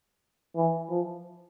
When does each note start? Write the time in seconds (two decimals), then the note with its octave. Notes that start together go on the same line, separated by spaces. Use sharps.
0.56 E3
0.90 F3